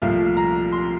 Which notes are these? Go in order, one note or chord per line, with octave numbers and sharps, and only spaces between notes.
C2 A#2 F3 A3 F5
A#5
C6